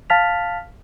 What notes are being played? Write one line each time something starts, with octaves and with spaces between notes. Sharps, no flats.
F5 A5 F6 A6 B6 F7